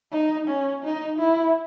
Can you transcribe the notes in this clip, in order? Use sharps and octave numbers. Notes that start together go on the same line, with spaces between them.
D#4
C#4
D#4
E4